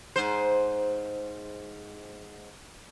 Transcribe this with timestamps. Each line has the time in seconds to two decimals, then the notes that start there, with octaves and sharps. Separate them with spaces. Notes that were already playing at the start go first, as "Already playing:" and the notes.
0.16 G#2 C5